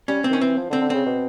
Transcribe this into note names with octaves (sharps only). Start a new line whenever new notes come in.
G3 C#4
C4
D#3 C#4
E3 C4
F3
D3
C4
D3
C#3 C4
B2